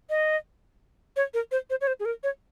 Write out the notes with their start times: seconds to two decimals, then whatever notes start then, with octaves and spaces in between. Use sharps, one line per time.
0.10 D#5
1.16 C#5
1.34 A#4
1.51 C5
1.70 C5
1.81 C#5
1.87 C5
2.00 G#4
2.05 A#4
2.23 C#5